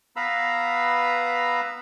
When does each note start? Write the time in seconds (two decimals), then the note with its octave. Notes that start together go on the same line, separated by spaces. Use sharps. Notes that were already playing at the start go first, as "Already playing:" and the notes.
0.16 B3 B4 F5 A#5 B5 E6